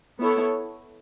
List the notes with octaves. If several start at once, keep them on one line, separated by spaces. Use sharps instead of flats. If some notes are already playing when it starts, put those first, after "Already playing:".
B3 E4 A4 C#5